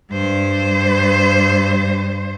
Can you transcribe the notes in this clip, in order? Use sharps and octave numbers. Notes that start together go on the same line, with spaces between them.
G2 C5